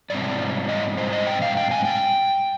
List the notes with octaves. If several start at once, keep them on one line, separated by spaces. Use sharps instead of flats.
G#2 G3 C4 D5
D#5
C5
D#5
G5
F5
G5
G#5
G5